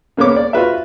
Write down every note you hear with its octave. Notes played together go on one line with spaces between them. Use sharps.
C#3 A#3 B3 C#5 D6
D5
F4 F#4 B4 E5